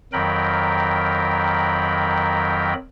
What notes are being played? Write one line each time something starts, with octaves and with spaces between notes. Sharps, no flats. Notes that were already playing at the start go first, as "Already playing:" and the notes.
F2 D#3 F#3 A#4 G5 B5